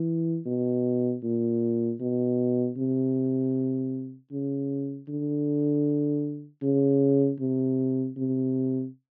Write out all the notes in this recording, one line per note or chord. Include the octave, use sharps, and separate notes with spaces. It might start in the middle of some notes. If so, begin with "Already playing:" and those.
Already playing: E3
B2
A#2
B2
C3
C#3
D3
C#3
C3
C3